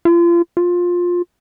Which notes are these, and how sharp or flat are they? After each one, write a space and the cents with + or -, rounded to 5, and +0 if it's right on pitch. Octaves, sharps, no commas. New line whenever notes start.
F4 -35
F4 +15